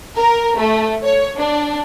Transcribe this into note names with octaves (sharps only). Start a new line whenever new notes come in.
A#4
A3
C#5
D4